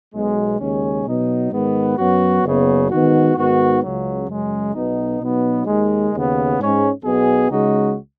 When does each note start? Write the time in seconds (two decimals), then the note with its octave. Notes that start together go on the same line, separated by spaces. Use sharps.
0.14 B1 B2 G#3
0.60 D#2 C#3 G#3 C#4
1.06 B2 F#3 B3 D#4
1.51 G#2 D#3 G#3 B3
1.98 F#2 F#3 B3 F#4
2.44 F#1 F#2 C#3 B3
2.90 G#2 D#3 B3 D#4 F#4
3.36 G#2 D#3 B3 F#4
3.82 C#2 C#3 F#3
4.28 F#2 C#3 G#3
4.73 B1 B2 B3 D#4
5.20 B2 F#3 B3 D#4
5.66 D#2 D#3 G#3
6.11 D#2 C#3 B3
6.57 G#2 G#3 C#4
7.03 B1 B2 B3 G#4
7.50 C#2 C#3 G#3 D#4 F#4